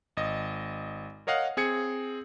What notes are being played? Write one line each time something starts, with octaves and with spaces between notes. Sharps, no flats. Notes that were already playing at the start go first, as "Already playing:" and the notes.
G#1 D#5
A#4 C#5 D#5 F5 F#5
C4 G#4 G#6 C#7